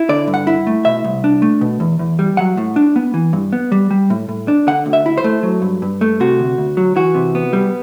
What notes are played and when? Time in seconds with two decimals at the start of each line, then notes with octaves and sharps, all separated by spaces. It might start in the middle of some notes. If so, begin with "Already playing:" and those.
Already playing: E4
0.09 D3 D5
0.27 G2
0.34 F#5
0.47 E4
0.67 A3
0.85 B2 E5
1.04 C2
1.24 D4
1.42 A3
1.61 B2
1.80 E2
1.99 E2
2.19 G3
2.37 F#3 F#5
2.57 A2
2.76 D4
2.96 B3
3.14 E3
3.33 G2
3.53 B3
3.72 G3
3.91 G3
4.10 A2
4.29 A2
4.48 D4
4.67 D3 F#5
4.86 D2
4.93 E5
5.06 E4
5.18 C5
5.24 A3
5.43 F#3
5.62 G2
5.82 G2
6.01 A3
6.20 C3 F#4
6.39 D2
6.58 D2
6.77 F#3
6.96 E3 F#4
7.15 C3
7.35 B3
7.53 G3